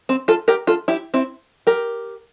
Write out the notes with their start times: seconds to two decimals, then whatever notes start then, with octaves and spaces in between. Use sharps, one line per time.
0.09 C4
0.28 F4 A4
0.48 G4 A#4
0.67 F4 A4
0.88 E4 G4
1.14 C4 E4
1.67 G4 A#4